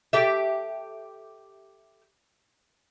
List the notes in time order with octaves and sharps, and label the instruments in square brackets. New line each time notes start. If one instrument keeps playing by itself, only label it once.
[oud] G4 A4 E5